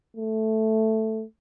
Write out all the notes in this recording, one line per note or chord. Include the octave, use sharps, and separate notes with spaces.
A3